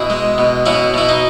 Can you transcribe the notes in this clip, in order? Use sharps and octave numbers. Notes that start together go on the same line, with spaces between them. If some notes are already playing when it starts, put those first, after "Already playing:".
Already playing: B2 E4 G#4
G#3
B2
B2 C#4 E4
B2 E4
D#4